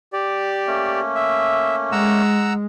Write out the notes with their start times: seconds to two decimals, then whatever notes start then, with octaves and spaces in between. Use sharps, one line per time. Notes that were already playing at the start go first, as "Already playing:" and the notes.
0.13 G4 D5
0.67 A3 A#3 C#4
1.15 E5
1.92 G#3 F#5 A#5 E6